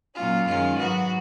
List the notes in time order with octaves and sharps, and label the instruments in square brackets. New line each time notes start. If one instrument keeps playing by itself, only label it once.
[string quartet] A#2 F#3 C#4 F4
F#2 D#3 G#3 C#4 F4
G#2 F#3 B3 F#4